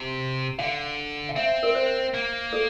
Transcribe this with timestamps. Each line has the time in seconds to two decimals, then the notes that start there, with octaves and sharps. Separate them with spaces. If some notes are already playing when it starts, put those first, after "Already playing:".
Already playing: C3
0.59 D3 F5
1.29 F5
1.36 C4 E5
1.63 A#4
1.75 C5
2.14 A#3
2.53 A4